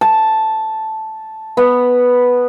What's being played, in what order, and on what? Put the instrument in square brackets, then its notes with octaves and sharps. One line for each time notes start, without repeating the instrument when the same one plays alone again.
[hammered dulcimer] A5
B3